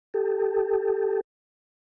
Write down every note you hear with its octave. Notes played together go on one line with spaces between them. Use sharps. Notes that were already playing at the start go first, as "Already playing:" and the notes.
G4 A4